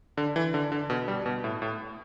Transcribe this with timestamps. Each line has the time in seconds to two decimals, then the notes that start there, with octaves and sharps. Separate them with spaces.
0.17 D3
0.36 E3
0.54 D3
0.72 D3
0.90 B2
1.08 G3
1.26 B2
1.44 A2
1.62 A2